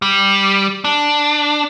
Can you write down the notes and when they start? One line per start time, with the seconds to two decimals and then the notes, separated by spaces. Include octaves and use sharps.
0.02 G3
0.84 D4